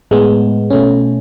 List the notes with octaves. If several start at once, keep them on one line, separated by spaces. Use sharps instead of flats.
A2 G#3 B3
B2 A3 C#4